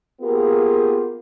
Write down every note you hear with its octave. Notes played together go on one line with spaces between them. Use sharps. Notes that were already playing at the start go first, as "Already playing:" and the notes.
A#3 B3 F4 G4 G#4 A#4